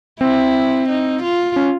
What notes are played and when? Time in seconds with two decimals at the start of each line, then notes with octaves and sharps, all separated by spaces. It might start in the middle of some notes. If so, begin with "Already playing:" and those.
0.21 C4 E4
0.89 D#4
1.22 F4
1.56 C#4